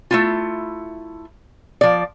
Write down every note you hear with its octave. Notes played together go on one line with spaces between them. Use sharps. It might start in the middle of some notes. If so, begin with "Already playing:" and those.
A3 E4 F4
F3 D5